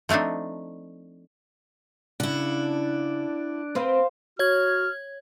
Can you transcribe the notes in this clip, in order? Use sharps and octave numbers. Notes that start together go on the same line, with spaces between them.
F3 A3 C4 D4 D#4
C#3 D4 E4 F#5
C4 B4 C5 F5
F#4 C#5 F6 G#6